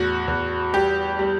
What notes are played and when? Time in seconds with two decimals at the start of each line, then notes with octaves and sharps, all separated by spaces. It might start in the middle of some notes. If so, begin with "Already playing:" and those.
Already playing: E2 A2 F#4
0.28 E2
0.73 G3 G4
1.19 G3